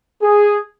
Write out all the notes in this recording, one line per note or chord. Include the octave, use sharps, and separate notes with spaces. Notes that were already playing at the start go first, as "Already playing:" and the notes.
G#4